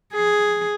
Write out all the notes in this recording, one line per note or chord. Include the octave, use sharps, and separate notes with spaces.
G#4